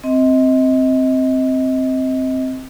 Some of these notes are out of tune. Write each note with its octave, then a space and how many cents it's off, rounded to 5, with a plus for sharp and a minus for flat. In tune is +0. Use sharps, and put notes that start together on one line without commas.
C4 +0 D#5 +30